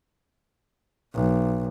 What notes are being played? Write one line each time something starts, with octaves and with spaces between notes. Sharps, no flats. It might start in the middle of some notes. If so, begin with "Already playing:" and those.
B1